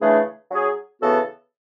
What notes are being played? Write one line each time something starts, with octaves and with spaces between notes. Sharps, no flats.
C#3 E3 A3 D4 G#4
F#3 C#4 G#4 C#5
C#3 E3 B3 F#4 A4